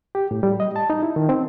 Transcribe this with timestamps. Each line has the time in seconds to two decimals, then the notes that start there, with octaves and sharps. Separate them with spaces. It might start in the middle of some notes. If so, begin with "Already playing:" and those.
0.15 G4
0.31 A2
0.43 G3
0.60 D#5
0.76 A5
0.90 D#4
1.03 E4
1.16 D#3
1.29 C4